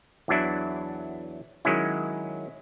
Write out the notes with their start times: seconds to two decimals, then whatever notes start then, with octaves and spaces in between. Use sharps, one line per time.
0.28 E2 E3 F#3 D4 E4
1.65 D#3 F#3 G#3 C#4 E4